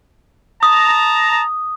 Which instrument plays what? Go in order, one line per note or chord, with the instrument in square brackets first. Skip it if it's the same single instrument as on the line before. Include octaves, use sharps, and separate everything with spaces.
[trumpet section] A5 A#5 [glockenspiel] D#6